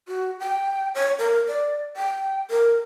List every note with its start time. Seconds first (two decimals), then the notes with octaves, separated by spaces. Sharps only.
0.08 F#4
0.40 G5
0.95 C#5
1.19 A#4
1.48 D5
1.96 G5
2.50 A#4